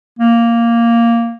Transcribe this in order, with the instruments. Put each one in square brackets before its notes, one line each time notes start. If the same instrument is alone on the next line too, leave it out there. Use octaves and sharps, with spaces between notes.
[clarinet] A#3